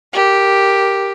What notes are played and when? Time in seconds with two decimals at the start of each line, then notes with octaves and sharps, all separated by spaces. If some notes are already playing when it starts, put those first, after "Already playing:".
0.13 G4 A#4